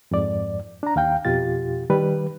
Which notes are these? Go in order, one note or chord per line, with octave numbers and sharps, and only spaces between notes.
F2 G#2 D5
D4 A#5
D#2 F5 G5
F2 B2 F4 G4 A6
D#3 G3 B4